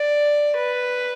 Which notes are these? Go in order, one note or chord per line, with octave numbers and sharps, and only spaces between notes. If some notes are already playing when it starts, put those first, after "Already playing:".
Already playing: D5
B4